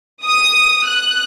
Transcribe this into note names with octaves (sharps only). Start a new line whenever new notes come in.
D#6
F#6